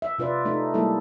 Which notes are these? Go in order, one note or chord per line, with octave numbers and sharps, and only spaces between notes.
E5
C3 F4 B4 D5
A3 D#4
G3 G#3 A#3 E4 A4